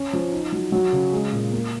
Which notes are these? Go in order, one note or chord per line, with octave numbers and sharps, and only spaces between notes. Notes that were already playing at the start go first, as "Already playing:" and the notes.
Already playing: C#4
F3
D#4
F#3
F#3
C#3
G#3
A#2
A#3